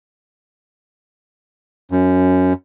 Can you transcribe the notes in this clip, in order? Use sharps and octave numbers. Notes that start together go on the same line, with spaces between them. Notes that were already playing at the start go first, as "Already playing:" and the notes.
F#2